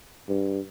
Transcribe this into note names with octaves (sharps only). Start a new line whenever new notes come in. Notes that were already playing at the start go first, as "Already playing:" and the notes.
G2